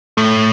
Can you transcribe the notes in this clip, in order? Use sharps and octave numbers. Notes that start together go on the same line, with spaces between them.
A2 A3